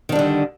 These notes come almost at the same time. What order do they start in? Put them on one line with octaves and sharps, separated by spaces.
D#3 D4 G3 D3